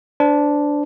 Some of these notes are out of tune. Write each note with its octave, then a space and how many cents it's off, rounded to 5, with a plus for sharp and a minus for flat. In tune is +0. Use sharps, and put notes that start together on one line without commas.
D4 -5 C5 -25